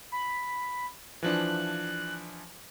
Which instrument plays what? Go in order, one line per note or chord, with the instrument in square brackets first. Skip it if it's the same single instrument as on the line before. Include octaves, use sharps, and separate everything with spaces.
[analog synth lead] B5
[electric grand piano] E3 F3 D4 [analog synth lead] F#6